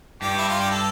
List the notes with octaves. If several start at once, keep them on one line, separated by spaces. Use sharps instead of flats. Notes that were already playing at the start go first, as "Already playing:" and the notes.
G2 G4
E4
F4
G4
A4